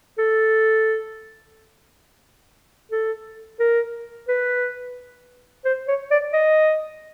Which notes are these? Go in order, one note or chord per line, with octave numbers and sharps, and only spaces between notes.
A4
A4
A#4
B4
C5
C#5
D5
D#5